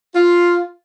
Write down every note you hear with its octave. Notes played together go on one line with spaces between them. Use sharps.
F4